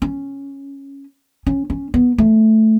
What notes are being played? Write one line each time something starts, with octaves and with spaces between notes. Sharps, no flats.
C#4
C#4
C#4
B3
A3